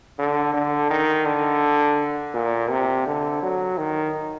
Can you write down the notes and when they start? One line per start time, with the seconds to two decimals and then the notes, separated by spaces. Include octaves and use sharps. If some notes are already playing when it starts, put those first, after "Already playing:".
0.19 D3
0.54 D3
0.90 D#3
1.26 D3
2.34 A#2
2.70 C3
3.06 D3
3.43 F#3
3.78 D#3